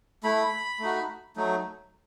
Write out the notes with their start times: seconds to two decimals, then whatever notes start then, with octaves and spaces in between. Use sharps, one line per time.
0.24 A3 E4 B5
0.80 A3 D#4 F#4
1.36 F#3 A3 D#4